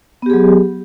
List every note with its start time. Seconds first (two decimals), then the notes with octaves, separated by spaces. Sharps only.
0.22 B3
0.26 G4
0.30 G#4
0.33 F#3